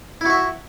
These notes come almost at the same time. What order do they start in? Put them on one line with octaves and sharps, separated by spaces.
E4 F#4 E5